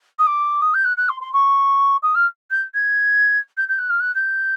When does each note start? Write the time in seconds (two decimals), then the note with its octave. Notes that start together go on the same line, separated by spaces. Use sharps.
0.19 D#6
0.27 D6
0.61 D#6
0.74 G6
0.84 F#6
0.97 F#6
1.09 C6
1.21 C6
1.33 C#6
2.02 D#6
2.15 F6
2.51 G6
2.74 G#6
3.57 G6
3.68 G6
3.78 F#6
3.90 F6
4.00 F#6
4.15 G6